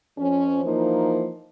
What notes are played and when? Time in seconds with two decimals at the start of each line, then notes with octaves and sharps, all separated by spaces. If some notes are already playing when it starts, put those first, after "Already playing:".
0.18 F2 F3 C#4
0.64 E3 F3 A#3 D#4 C5